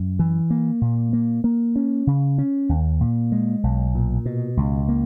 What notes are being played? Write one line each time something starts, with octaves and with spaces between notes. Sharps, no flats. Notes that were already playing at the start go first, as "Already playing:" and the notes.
Already playing: F#2
E3
A#3
A#2
A#3
A#3
C#4
C#3
C#4
D#2
A#2
G#3
B1
A#2
B2
C#2
A#3